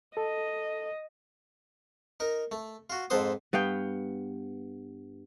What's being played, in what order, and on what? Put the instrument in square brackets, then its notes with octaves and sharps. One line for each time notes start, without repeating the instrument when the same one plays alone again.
[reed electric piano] A4 [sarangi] D#5
[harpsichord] D#4 A#4
A3
F4 F#4
F2 G#2 A4 B4 C5 D#6
[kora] G2 B3 F5 G5